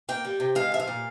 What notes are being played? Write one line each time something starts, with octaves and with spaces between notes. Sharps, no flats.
A#3 G5
G3
C3
G#3 F5
F3 E5
F5
A#2